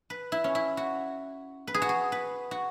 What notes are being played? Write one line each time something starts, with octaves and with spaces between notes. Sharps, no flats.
B4
E4
C#4
E4
F#4
B4
G#4
F#4
G#4
B4
F#4